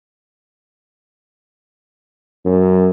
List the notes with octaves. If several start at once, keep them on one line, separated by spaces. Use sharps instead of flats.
F#2